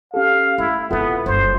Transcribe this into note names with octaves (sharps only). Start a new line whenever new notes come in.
C#4 G4 A4 F5
A3 E4
F1 B3 E4 F4 A4 E5
F#1 G3 C5